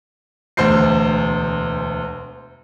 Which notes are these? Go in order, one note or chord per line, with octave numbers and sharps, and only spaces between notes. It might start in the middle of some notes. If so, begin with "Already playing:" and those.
E1 D2 C5 G6 C7